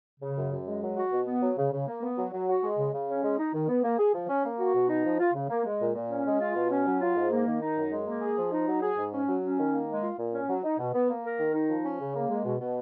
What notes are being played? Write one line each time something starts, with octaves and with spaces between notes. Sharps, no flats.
C#3
F#2
F#2
G#3
F#3
F#4
B2
B3
F#3
C#3
C#3
A#3
B3
F#3
F#3
F#4
G#3
C#3
C#3
C#4
G#3
D#4
D#3
B3
A#3
G#4
F3
C#4
A#3
F#4
B2
D#4
F3
F4
C#3
A#3
G#3
A#2
A#2
C#4
G#3
F4
B2
C#4
F#3
F4
G#2
A#3
D#3
D#4
F#2
G#3
A#3
G#4
F3
D#4
F#3
G#4
G#2
C#4
F#3
C#4
D#3
A#3
G#3
F4
A#2
C#4
F#3
D#4
B2
B3
A#3
A#4
D#3
D#4
F3
C#4
C#3
A#3
G#3
B2
B2